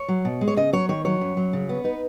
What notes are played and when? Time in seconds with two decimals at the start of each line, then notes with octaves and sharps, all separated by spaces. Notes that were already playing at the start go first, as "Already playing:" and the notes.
Already playing: C#5
0.08 F#3
0.25 B2
0.41 G#3
0.48 C#5
0.57 C#3 D#5
0.73 F#3 C#5
0.89 D#3 C#5
1.05 F#3 C#5
1.21 F#2
1.37 F#3
1.53 C#3
1.69 B3
1.84 D#4 B4